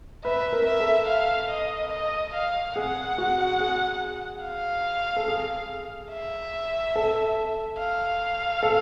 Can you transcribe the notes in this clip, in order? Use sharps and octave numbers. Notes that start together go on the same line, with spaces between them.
B4 E5
A#4
E5
A4
F5
D#5
D#5
F5
G#4 F#5
F#4
G#4
F5
A4
G#4
E5
A4
F5
A4